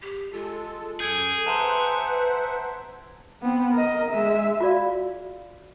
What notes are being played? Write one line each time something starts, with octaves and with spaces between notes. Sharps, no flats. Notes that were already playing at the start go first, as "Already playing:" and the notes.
G4
G#3 F4 A4
F#2 G#4 A4 G6 G#6 D7
B4 C5 E5 F#5 A5 A#5 C6
B3 C4
A#4 D#5
G#3 E5
F4 F#4 D5 F5